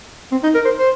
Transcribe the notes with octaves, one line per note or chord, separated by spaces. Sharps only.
C4
D#4
A#4
C5
C5